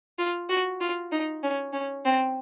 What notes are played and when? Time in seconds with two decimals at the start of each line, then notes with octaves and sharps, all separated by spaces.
0.18 F4
0.49 F#4
0.81 F4
1.12 D#4
1.43 C#4
1.73 C#4
2.05 C4